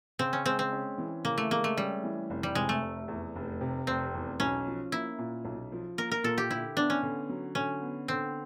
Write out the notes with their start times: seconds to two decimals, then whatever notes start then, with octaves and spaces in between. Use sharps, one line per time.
0.19 C#3 C4
0.33 C#4
0.46 G#3 C4
0.59 C4
0.73 C#4
0.98 E3
1.24 C#3 A#3
1.38 A3
1.51 G#3 A#3
1.64 A3
1.77 G3 C#4
2.03 E3
2.30 F1
2.43 G3
2.55 C3 G#3
2.69 A3
2.82 F1
3.08 E2
3.35 F1
3.61 C3
3.87 F1 C4
4.14 E2
4.40 B1 C#4
4.67 F3
4.92 A#3 E4
5.18 A#2
5.45 B1
5.72 F3
5.98 A#3 A#4
6.12 A#4
6.24 A#2 A4
6.38 G4
6.50 D3 E4
6.77 B3 D4
6.90 C#4
7.03 D3
7.29 F#3
7.55 D3 C#4
7.81 B3
8.08 D3 C4